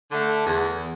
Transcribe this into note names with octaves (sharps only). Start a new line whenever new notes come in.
D3 A3
E2